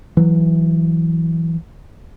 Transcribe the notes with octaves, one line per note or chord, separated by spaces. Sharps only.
E3 F#3